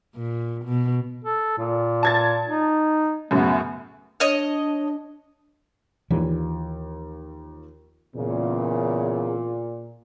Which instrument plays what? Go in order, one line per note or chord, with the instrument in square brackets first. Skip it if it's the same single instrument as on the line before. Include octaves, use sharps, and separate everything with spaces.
[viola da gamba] A#2
B2
[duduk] A4
A#2
[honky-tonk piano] A5 G#6 A6
[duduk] D#4
[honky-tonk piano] F#2 A2 C#3 [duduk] B3
[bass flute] D4 [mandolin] C#5 D#5
[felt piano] D#2 F3 [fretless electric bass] E3
[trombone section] E2 C#3 [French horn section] A#2